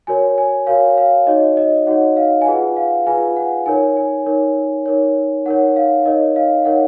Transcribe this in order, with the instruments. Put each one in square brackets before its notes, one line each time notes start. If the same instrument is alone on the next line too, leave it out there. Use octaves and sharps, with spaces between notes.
[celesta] F#4 A#4 C#5 G#5
G#5
F#4 A#4 C#5 F5
F5
D#4 F#4 C#5 D#5
D#5
D#4 F#4 C#5 F#5
F5
G#5
F4 G#4 B4 F#5
F5
F4 G#4 B4 G#5
F#5
D#4 A#4 C#5 G#5
G#5
D#4 A#4 C#5
D#4 A#4 C#5
D#4 A#4 C#5 F#5
F5
D#4 A#4 C#5 D#5
F5
D#4 A#4 C#5 F#5